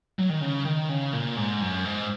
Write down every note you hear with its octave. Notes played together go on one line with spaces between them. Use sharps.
F#3
D#3
C#3
D#3
C#3
A#2
G#2
F#2
G#2